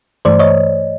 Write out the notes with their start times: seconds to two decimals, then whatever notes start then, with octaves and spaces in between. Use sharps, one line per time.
0.25 G2 E3 A3 C5 D5
0.39 C#5 D#5